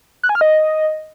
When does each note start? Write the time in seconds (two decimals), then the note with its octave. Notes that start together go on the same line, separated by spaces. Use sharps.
0.23 F#6
0.29 G#5
0.35 F6
0.41 D#5